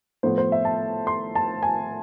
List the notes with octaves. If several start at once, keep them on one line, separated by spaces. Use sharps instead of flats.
A2 F3 B3 C5
C5
E5
A5
C6
A5
G#5